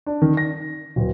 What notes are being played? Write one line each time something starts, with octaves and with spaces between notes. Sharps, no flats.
D4
D#3
A#6
D1